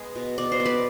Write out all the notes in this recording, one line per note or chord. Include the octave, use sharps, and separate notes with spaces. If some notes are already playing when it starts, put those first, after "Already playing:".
Already playing: G#3 B3 G#4
B2
B2 D5
C5
B3
B4 D5